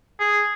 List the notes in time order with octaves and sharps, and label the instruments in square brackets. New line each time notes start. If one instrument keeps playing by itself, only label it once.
[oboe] G#4